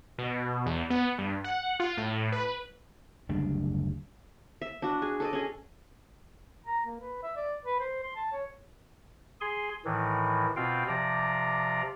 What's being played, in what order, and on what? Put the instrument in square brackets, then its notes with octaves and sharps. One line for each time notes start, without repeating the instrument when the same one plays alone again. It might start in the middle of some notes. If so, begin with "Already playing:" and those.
[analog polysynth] B2
E2
B3
G2
F#5
F4
A2
B4
[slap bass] F#1 D2 G3 D4
[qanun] E5
D4 F#4
G#4
A4 D5 D#5
C#4 G#4
[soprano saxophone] A#5
A#3
B4
E5
D5
B4
C5
C6
A5
C#5
[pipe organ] G#4 G#5 C6
A2 D#3 E3
B2 C4 F4 F5 G5
C3 F3 D5 A#5